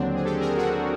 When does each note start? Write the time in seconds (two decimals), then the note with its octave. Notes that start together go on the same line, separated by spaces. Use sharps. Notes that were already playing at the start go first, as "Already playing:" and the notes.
Already playing: D#2 D3 F#3 C4 D4
0.14 G#4
0.24 G4 A4
0.40 G#4 A#4
0.57 F#4 G#4